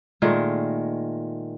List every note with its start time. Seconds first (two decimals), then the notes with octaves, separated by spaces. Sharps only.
0.22 A#2 D#3 G#3 A3